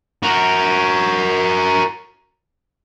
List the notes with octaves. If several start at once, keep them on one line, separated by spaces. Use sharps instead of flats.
F#4 A#4